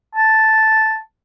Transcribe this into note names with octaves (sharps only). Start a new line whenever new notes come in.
A5